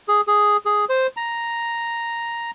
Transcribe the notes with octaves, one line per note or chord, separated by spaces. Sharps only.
G#4
G#4
G#4
C5
A#5